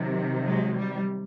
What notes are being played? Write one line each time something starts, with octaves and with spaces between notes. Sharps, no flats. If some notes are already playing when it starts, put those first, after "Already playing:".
Already playing: C3 D#3 F#3
F#3 G#3
G3